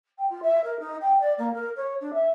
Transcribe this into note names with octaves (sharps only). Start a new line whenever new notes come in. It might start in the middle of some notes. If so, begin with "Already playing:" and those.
G5
F4
E5
A#4
D#4
G5
D5
A#3
A#4
C#5
D4
E5